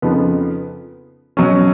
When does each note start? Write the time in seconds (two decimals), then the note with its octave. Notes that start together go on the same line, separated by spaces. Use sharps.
0.02 F2 C#3 F3 B3 D#4
1.37 B2 F#3 C#4